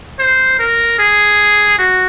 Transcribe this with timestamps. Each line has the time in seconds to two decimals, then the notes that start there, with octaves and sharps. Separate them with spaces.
0.19 C5
0.59 A#4
0.99 G#4
1.79 F#4